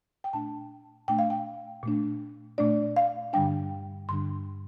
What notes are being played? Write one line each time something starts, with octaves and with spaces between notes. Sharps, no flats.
G5
A#2 A3 D4 A5
A#2 A3 D4 G5
F5
G5
A#2 A3 D4
A#2 A3 D4 D5
F5
G2 D3 G3 D4 G5
G2 D3 G3 D4 C6